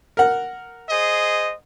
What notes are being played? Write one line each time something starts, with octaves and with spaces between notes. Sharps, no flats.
A#4 F#5
G#4 C5 D#5